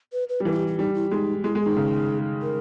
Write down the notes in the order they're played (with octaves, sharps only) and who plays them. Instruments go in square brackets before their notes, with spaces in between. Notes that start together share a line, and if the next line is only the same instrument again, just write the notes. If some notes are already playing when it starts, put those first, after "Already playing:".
[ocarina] B4
B4
[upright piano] G3
[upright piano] E3 [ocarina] A#4
[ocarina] E4
G4
E4
[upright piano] G3 [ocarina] D#4
[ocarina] E4
[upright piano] G#3 [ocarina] D#4
[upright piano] G#3 [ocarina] E4
[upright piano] G#3
[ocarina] G#4
[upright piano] D#3
C#3
[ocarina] A#4